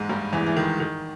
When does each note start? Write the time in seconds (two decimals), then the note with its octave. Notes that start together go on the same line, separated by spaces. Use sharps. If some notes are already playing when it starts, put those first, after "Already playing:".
Already playing: E2 G#2 G#3
0.09 G2 G3
0.33 E2 E3
0.46 E3
0.56 D#3
0.80 D#3